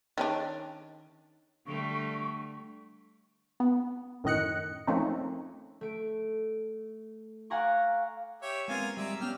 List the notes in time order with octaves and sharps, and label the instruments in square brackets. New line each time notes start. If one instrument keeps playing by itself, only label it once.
[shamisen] D#3 C#4 D4
[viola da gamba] D3 G3 A3 [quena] C#6
[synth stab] B3
F#2 A2 D#3 D#5 F#6 C#7
F3 A3 A#3 C4 C#4 D#4
[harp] A3 D7
F5 F#5 G#5 A#5 C#6 D6
[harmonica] G4 C#5 E5
[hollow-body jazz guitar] G#3 B3 C4 [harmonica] F4 A#4 G#5
[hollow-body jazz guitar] G3 G#3 A#5 [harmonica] D5 E5
[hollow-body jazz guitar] B3 C#4 [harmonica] G4 F6